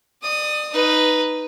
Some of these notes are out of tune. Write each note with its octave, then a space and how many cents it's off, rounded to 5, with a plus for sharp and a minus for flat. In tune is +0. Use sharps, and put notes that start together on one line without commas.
D5 +35 D#6 +0
D#4 +0 B4 +0